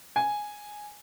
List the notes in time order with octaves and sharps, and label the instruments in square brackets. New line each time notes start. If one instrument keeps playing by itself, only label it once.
[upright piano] G#5